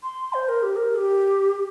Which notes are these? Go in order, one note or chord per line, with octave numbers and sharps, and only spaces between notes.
C6
C5
A#4
G4
A#4
G4